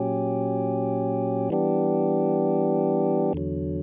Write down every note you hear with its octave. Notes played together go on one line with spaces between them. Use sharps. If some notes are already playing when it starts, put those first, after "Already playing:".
Already playing: A#2 F#3 C#4 G4
E3 G3 B3 D4 G4
E2 D3 F#3